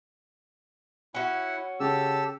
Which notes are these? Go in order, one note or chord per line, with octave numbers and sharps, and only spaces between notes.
C#4 E4 F#4 F#5
C#3 G4 A4 E6